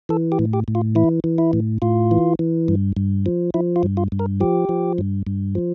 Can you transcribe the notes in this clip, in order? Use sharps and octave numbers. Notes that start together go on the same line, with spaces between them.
E3 A4
G4
A2
G4
A2
F4
E3 E4
E3
E4
A2
A2 F4
E3
E3
G2
G2
F3
F3 E4
F4
G2
F4
G2
A#4
F3 G4
F3
G2
G2
F3